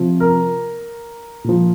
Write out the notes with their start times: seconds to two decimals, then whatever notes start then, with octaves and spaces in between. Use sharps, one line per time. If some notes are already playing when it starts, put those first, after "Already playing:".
Already playing: C3 F3
0.20 A#4
1.44 A#2 F3